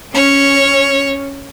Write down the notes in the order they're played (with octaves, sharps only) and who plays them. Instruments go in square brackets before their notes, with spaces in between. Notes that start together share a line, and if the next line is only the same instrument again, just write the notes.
[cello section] C#4 [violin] C#5